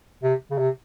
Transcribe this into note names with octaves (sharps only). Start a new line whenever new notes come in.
C3
C#3
C3